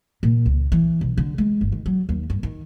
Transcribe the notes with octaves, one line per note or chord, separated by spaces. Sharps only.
A#2
C#2
E3
B1
D3
G#3
G1
D#3
F#3
D#2
G2
D#3